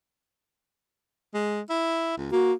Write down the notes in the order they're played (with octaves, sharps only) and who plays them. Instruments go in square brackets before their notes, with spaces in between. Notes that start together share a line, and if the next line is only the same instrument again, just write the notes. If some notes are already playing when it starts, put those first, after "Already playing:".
[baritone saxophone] G#3
E4
C#2
[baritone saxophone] A#3 [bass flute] F#4